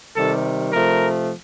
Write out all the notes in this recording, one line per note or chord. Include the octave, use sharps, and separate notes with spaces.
C3 D#3 G3 A4
C3 F3 A3 A#4